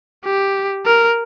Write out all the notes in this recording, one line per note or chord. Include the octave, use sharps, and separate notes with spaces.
G4
A#4